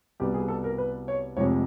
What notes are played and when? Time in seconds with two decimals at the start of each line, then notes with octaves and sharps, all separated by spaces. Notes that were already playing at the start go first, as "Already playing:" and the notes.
0.20 C2 B2 G3 B3 G4
0.34 G#4
0.48 A4
0.64 A#4
0.78 B4
1.08 C#5
1.37 F1 F2 C3 F3 G#3 C#5